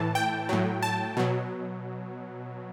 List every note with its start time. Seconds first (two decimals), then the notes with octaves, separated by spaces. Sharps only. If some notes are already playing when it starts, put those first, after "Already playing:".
Already playing: A2 E3 A5
0.15 G5
0.49 A2 F#3
0.83 A5
1.17 B2 F#3